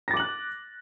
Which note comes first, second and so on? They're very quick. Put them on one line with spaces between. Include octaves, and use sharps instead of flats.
A#6 A6 D6 F#7 F#6